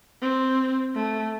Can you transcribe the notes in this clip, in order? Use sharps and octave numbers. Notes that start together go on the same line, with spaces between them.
C4
A3